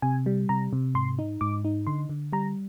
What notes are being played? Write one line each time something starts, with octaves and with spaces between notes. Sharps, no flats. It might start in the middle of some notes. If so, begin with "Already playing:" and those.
C3 G#5
G3
C3 A#5
C3
G#2 C6
D#4
G#2 D6
D#4
D3 C6
D3
G3 A#5